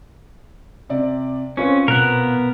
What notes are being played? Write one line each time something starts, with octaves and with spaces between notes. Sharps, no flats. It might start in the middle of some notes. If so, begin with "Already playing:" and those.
C3 D5
C4 C#4 F4 B4
B2 B3 A#4 F#6